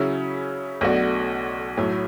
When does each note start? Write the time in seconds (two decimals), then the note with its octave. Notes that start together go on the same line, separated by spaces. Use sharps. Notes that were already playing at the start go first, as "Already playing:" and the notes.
Already playing: C#3 F#3 C#4 E4
0.81 B1 B2 A3 D4 F#4
1.77 B1 A2 F#3